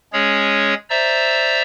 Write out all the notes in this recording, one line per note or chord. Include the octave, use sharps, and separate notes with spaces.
G#3 C#4 G#4 C#5
C5 D5 E5 A#5 E6